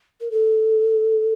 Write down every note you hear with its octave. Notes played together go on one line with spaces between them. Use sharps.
A#4
A4